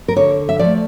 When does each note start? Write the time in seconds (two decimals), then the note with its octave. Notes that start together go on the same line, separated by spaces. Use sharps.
0.08 A#4
0.16 D3 C#5
0.49 E5
0.59 F3 A3 D5